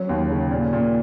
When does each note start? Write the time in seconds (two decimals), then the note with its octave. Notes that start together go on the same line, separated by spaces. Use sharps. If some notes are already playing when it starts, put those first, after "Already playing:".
Already playing: F#3 C#4
0.09 D#2
0.30 C#3
0.51 A#2
0.73 A#2